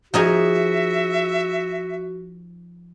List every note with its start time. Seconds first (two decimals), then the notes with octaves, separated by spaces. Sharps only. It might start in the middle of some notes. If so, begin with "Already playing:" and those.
0.14 F3 D#4 F#4 G#4 E5